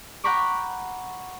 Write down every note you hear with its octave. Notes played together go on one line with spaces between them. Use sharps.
F#5 G5 A#5 B5 C#6 D6